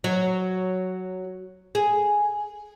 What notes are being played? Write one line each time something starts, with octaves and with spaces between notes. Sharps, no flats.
F#3
G#4